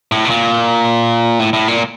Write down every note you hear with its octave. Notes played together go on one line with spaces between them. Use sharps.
A2
B2
A#2
A2
A2
A#2